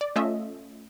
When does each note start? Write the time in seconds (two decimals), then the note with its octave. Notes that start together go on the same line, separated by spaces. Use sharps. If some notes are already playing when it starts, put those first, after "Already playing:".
0.01 D5
0.16 A3 C#4 F4 D#5 E5